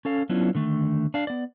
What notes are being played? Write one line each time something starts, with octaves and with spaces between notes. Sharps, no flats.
C#4 A4 F5
F#3 B3 C#4 D4 E4 F4
D3 D#3 A3
D4 F5
B3 D5